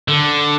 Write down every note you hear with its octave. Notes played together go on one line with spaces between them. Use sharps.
D3